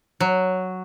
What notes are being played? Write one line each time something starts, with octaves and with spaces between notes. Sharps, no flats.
F#3